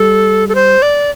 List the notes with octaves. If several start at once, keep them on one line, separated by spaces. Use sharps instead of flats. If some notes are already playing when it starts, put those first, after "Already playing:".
Already playing: G3 A4
A4
C5
D5